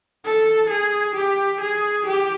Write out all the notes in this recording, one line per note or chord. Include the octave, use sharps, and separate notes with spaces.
A4
G#4
G4
G#4
G4